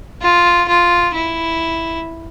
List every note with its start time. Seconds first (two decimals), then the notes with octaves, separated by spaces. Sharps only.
0.22 F4
0.68 F4
1.14 E4